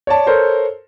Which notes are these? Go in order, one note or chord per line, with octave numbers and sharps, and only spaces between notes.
C#5 D5 A5
A4 A#4 C5 C#5